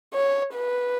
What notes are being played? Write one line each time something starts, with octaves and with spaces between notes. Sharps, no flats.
C#5
B4